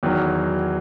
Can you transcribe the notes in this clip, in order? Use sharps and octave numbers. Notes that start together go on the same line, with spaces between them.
E2 D#3 F#3